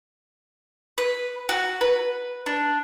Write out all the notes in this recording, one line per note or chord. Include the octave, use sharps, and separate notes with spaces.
B4
F#4
B4
D4